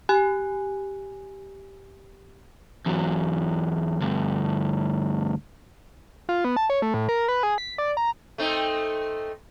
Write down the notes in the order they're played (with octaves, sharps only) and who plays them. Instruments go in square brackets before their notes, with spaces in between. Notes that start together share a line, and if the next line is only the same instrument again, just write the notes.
[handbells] G4 G#5 F#6
[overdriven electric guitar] E2 F#3
D2 G2
[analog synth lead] F4
B3
A5
C#5
A3
A2
A#4
B4
G#4
B6
D5
A#5
[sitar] A3 C4 D#4